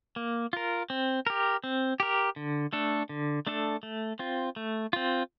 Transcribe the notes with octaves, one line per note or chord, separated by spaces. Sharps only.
A#3
F4 A#4
C4
G4 A#4
C4
G4 A#4
D3
A3 D4 A4
D3
A3 D4 A4
A3
C4 F4
A3
C4 F4